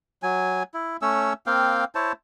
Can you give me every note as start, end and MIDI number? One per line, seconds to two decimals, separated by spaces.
0.23 0.63 54
0.23 0.63 80
0.74 0.97 64
1.02 1.33 57
1.02 1.33 61
1.02 1.33 73
1.02 1.33 88
1.46 1.85 58
1.46 1.85 60
1.46 1.85 77
1.46 1.85 79
1.95 2.12 64
1.95 2.12 72
1.95 2.12 73
1.95 2.12 81